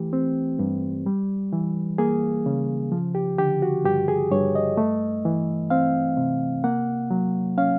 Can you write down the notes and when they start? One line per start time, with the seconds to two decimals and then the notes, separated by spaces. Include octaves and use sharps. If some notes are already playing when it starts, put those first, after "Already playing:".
Already playing: E3 A3 G4
0.13 C4
0.59 G2
1.06 G3
1.53 E3
1.98 A#3 G#4
2.46 C#3
2.92 F3
3.15 G4
3.38 D3 G4
3.62 F#4
3.84 G2 G4
4.08 G#4
4.32 G2 C#5
4.55 D#5
4.77 A3
5.25 E3
5.70 C4 F5
6.17 C3
6.64 A#3 F#5
7.10 F#3
7.58 C#4 F5